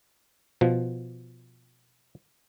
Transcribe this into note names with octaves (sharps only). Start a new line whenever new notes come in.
B2 F3